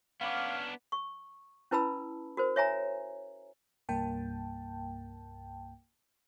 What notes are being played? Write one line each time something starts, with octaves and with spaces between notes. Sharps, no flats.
B3 C#4 D4 F5 F#5 B5 D6
C#6
C#4 E4 B4 A5 B5 E6
F#4 A#4 C5
C#5 E5 G#5 A#5
C2 G2 A#3 G5 A5